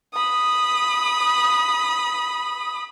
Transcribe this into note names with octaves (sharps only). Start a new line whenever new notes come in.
B5 D#6